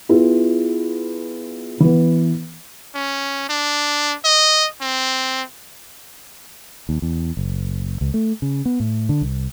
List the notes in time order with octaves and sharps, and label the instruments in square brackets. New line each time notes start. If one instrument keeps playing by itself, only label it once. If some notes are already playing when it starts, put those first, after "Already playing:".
[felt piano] B3 E4 F4 G#4
E3 B3
[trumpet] C#4
D4
D#5
C4
[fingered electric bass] D#2
E2
F#1
C#2
A3
C#3
B3
A2
D3
C2